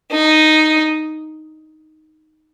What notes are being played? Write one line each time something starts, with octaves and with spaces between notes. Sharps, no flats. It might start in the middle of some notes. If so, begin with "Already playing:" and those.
D#4